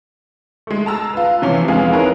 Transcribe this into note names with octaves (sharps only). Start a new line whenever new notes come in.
G#3 A3
A5 A#5 E6
F4 B4
C3 E3 F3 C#4
F2 D3 G#3 B3 F5 G#5
D#4 E4 G#4 A#4 B4 C#5